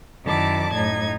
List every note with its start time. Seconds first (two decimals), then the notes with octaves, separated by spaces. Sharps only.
0.22 F#2 D#3 E4 D5 A5 D6
0.73 F#2 A2 D#4 G#6